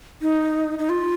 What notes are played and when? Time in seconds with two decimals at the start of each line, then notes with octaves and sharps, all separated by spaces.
0.22 D#4
0.79 D#4
0.89 F4